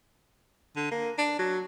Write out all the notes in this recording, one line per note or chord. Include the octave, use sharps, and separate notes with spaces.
D3
A#3
D4
F#3